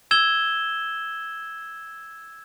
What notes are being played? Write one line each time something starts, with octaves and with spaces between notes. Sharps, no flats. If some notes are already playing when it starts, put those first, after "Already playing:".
E6 G#6 E7 G7